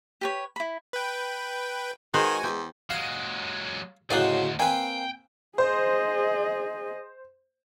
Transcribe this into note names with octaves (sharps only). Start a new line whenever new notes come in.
G4 B4 C#5
E4 B5
B4 G5
D#3 G#3 F#4 B4 C5 G#5
E2 G5
F#3 G#3 F5
D2 A2 C#3 F#3 C5 D5 D#5 F#5
A#3 C4 B4 G5 G#5
G#4 C5 D#5